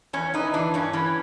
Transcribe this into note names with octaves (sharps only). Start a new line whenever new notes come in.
E2 C#4
E3 D#4
E3 D4
G2 C#4
E3 C#4